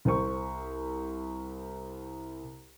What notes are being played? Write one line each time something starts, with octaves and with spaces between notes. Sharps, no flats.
C2 C5 C#6